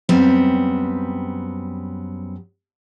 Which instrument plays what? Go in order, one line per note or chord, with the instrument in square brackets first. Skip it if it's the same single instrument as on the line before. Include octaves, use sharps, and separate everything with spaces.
[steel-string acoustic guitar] F#2 G3 B3 C4